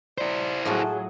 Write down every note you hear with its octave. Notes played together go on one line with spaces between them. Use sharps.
E4 C5 D5
A2 F#3 F4 F#4 G#4 A5